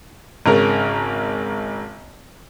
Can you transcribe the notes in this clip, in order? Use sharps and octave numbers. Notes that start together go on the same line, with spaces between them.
G#1 C#3 A#4